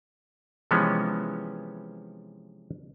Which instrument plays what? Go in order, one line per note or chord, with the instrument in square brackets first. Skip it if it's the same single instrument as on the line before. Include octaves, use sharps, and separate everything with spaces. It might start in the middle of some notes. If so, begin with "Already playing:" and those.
[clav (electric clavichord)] C3 E3 F3 G#3 B3 C#4